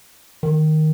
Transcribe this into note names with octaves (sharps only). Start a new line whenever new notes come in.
D#3